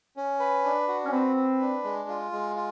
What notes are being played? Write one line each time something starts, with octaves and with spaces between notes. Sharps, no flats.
C#4
B4
D4
F#4
C#4
C4 B4
B4
D4
G#3
F4
G#3
F4